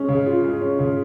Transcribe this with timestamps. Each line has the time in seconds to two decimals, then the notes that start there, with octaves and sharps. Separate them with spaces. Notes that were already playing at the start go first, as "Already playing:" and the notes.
Already playing: G#3 C#4
0.09 C#3
0.26 F4
0.44 G#3
0.61 C#4
0.79 C#3